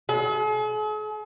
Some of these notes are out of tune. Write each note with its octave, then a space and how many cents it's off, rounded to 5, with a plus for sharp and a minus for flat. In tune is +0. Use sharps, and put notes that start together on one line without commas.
G#4 +45